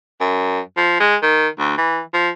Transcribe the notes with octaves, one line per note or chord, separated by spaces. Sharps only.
F#2
F3
G#3
D#3
D2
E3
F3